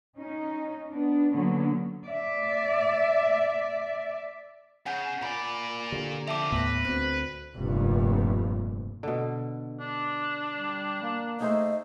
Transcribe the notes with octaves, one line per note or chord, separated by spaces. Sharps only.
C#4 D#4
B3 D4
D3 F#3 A#3 B3 C#4
D5 E5
C#3 F#5 G#5 G6
A#2 D5 G#5 B5
D3 G4
F3 G4 E5 A5 D6
D#2 A2 B3 B4 A#6
D2 C4 F#6
F1 G2 A#2
B2 D3
D4
G3
A#3
A3 D#4 G#4 C5 D#5